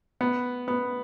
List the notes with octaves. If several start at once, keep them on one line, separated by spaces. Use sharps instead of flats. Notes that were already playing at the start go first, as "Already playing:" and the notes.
B3
B3